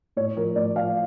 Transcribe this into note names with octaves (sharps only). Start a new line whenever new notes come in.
A2 C#5
F3 A#4
A2 D5
F3 F5